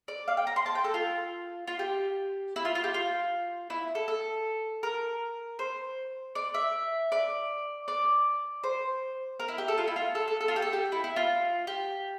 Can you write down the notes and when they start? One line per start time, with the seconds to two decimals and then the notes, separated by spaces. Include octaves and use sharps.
0.08 D5
0.28 F5
0.37 G5
0.47 A#5
0.56 C6
0.66 A5
0.75 G5
0.84 A4
0.94 F4
1.68 F4
1.79 G4
2.56 E4
2.65 F4
2.75 F4
2.84 G4
2.94 F4
3.70 E4
3.95 A4
4.08 A4
4.83 A#4
5.59 C5
6.35 D5
6.54 E5
7.12 D5
7.88 D5
8.64 C5
9.40 A#4
9.48 E4
9.58 G4
9.68 A4
9.78 F4
9.87 E4
9.96 F4
10.15 A4
10.28 A4
10.41 A4
10.48 F4
10.56 G4
10.62 A4
10.73 G4
10.92 E4
11.04 E4
11.16 F4
11.67 G4